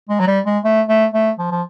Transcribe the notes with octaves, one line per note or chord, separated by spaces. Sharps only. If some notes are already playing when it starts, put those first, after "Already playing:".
G#3
F#3
G3
G#3
A3
A3
A3
F3
F3